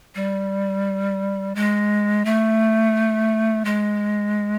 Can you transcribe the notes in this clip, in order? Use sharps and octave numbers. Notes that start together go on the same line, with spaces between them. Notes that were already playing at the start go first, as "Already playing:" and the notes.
G3
G#3
A3
G#3